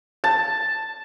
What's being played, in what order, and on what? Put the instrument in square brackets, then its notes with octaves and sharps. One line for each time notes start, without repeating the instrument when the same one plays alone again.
[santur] A5